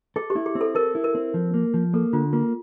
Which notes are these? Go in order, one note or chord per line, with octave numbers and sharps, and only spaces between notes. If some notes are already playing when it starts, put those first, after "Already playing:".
G#4 A4
G4
E4
G#4
C4
A4
A4 A#4
E4
A#4
C4
F3
A#3
F3
A#3 A4
D3 F4
A#3 F4